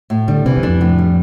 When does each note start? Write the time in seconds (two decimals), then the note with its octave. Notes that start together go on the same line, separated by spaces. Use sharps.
0.10 A2
0.28 D3 G3
0.46 C3 E3
0.57 E2
0.63 F2 D4
0.81 A2
0.99 G3